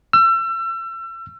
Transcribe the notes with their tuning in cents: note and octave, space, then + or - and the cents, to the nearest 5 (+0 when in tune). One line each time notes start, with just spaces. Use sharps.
E6 +35